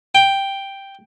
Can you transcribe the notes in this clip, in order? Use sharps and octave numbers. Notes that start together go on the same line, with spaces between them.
G5